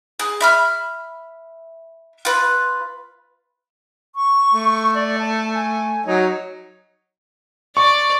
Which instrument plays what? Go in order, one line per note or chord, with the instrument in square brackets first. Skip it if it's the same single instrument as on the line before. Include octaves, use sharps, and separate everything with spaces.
[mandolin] G#4
E5 B5 F6
F4 B4
[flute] C#6
[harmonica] A3
[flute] D5
A5
G#5
[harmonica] F#3 D#4 [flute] C#5
[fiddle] D5 [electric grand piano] C#6